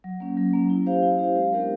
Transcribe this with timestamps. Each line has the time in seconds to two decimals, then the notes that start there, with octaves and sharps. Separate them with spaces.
0.04 F#3
0.20 A#3 C#4
0.37 F#3
0.53 A#3 C#4
0.70 E4
0.86 G4 C5 F5
1.03 E4
1.19 G4 C5 F5
1.36 G#3
1.53 B3 D4 G4 A#4